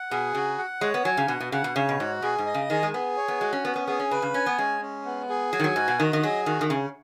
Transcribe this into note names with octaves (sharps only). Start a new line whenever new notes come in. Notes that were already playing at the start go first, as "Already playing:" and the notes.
Already playing: F#5
B2 G#4
C#3 F#4
F#5
G#3 C#5
B3
F#3 G#5
C#3
B2 F#5
B2
C#3 F#5
B2
C#3 C#5
B2
G#2 F#4
B2 G#4
G#2
D#5
C#3
D#3 G#4
G#3
B3 G#4
C#5
B3
G#3 F#4
C#4
B3 C#4
B3
B3 G#4
C#4
C#3 B4
C#3
C#4 G#5
B3
G#3 C#4
C#4
B3
G#4
F#3 G#5
D#3
F#3
G#2 F#4
B2
D#3 D#5
D#3
F#3 G#4
D#3 F#4
D#3
C#3 C#4